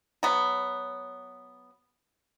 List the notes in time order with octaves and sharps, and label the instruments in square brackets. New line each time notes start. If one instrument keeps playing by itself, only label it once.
[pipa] F#3 B3